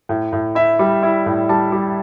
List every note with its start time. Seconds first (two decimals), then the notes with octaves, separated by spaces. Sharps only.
0.09 A2
0.33 A2
0.55 E4 E5
0.79 G3
1.03 E4
1.26 A2
1.49 G3 A5
1.72 G3